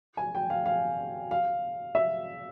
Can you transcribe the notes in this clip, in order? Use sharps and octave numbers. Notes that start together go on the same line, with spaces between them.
G#5
G5
F5
F5
F5
E5